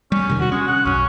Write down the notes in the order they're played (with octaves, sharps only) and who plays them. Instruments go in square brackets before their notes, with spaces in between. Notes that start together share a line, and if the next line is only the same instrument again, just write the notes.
[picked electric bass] G3 [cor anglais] C#4
[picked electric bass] E1 C3 D#3
[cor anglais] F#4
[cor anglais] G#3 [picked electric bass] C#4
[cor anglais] F#5
[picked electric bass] B1 F#2 [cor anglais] C#4